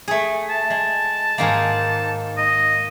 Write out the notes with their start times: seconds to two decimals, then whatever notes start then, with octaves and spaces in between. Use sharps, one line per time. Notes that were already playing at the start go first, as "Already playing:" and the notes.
0.08 A3 G#4
0.50 A5
0.70 G#3
1.38 G#2 D#3 A#3
2.38 D#5